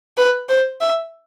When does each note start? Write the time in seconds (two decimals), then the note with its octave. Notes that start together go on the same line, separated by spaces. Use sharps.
0.17 B4
0.49 C5
0.81 E5